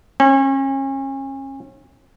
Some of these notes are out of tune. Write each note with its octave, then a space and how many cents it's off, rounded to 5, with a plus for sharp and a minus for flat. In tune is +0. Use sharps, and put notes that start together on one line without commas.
C#4 -35